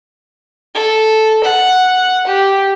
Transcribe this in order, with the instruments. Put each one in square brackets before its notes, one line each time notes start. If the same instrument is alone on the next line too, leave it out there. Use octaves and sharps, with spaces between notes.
[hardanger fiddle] A4
F#5
G4